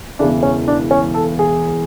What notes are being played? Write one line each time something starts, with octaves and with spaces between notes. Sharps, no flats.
E1 E2 C#3 E3 D4
C#4
D4
C#4
A4
G#4